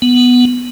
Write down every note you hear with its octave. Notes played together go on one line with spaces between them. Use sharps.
B3